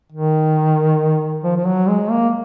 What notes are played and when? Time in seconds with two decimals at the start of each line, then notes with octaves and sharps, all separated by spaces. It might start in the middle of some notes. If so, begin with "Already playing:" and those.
0.12 D#3
1.44 F3
1.56 F3
1.67 F#3
1.88 G#3
2.10 A#3